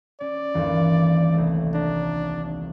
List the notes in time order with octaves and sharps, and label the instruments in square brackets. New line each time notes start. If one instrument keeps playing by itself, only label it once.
[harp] C#4 [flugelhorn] D5
[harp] G1 D#2 E3
C2 A3
[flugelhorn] D4 [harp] A#5